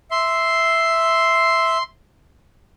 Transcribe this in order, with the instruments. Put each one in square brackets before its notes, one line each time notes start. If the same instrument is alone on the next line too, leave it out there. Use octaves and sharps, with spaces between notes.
[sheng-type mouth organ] E5 [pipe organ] C6